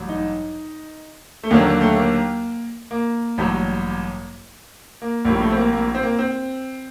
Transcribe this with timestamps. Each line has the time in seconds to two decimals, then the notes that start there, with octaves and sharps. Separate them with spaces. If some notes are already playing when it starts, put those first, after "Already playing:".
Already playing: A1 G2 F#3
0.09 D#4
1.43 A3
1.50 D#2 D3 F#3 A#3
1.66 A#3
1.81 A3
1.97 A#3
2.91 A#3
3.38 A1 G2 F#3
5.02 A#3
5.25 A#1 A2 G3 A#3
5.41 A3
5.51 C4
5.57 A#3
5.72 A#3
5.95 C4
6.03 A#3
6.19 C4